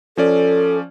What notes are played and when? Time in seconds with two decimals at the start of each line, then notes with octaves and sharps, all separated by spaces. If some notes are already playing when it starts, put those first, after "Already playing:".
0.17 F3 C#4 A4 D5